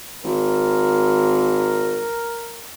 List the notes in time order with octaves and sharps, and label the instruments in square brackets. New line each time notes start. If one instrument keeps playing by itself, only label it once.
[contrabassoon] G#1 [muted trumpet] A#4